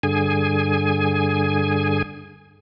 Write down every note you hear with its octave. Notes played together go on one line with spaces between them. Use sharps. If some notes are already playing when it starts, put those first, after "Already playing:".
G2 D3 G#4 G#5